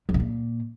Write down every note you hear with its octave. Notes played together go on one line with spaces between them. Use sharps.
F#2
C3
A#2